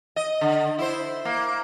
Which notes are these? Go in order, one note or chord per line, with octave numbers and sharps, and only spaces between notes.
D#5
D3
E4 C5
A#3